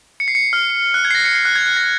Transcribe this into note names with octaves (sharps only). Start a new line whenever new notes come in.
C#7
C7
C#7
F6
F#6
G#6
C7
A#6
C#7
C7
F#6
G#6
F#6
A#6